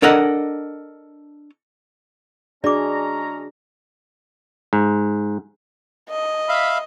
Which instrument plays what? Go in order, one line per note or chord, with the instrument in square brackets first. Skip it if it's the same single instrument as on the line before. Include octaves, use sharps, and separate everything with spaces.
[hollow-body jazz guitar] D4 A4 A#4 D#5 F#5
[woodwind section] G#3 C#4 A#5 [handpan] D4 F#4 G#4 [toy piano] D5 D6
[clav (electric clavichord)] G#2
[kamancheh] D#5
[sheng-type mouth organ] E5 F5 B5